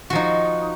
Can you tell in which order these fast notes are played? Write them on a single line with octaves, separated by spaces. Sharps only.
F#4 F3 D#4